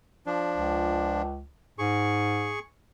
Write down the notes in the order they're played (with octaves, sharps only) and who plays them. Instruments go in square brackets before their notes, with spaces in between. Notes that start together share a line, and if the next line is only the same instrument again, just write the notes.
[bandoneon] F3 D4
[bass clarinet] C#2
[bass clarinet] G#2 [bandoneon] G#4 C#6